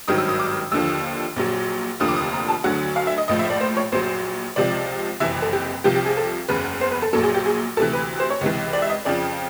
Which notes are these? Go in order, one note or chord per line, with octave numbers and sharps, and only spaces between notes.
G#1 G2 D#3 F#3 D#6
E6
D#6
D6
D#2 D3 F3 E6
A#1 A#2 F#3
F1 D#2 D3 F3 D#6
D6
D#6
A#5
A5
D2 D3 F#3 F#5
F5
E5
D#5
A#1 A2 F3 D#5
E5
D5
C5
C#5
A#1 A#2 F#3 C5
C#2 C3 F3 D5
F#1 F2 C3 E3 E5
A4
G4
C2 C3 F3 G4
G4
G#4
A4
F#1 E2 C#3 B4
C5
B4
A4
A#1 A#2 F#3 A4
G#4
G4
G#4
D2 C3 E3 A4
B4
C5
C#5
C#2 C3 E3
D5
E5
D#5
F2 C#3 F3 D5